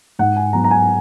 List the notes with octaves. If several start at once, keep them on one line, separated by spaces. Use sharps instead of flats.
G#2 F#5
G#5
F#3 B3 A#5
A#5
G#5